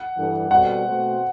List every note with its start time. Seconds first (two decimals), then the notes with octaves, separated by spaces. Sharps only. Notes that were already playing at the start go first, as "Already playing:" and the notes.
Already playing: F#5
0.16 G2 E3 G3 D4 A4
0.50 B2 G3 C4 F#4 A4 F#5
0.85 B2 A3 C4 F#4 C5